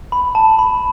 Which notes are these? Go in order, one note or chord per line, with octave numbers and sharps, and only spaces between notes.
B5
A5
B5